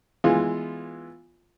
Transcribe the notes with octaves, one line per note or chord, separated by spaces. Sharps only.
E3 G#3 B3 F4